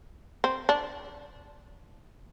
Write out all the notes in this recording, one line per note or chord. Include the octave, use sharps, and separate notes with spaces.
C4
D4